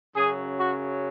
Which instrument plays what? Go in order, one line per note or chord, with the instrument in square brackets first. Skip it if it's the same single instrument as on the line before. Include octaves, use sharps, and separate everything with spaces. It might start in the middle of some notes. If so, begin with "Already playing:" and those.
[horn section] F#2 C#3 F#3 G#4
F#4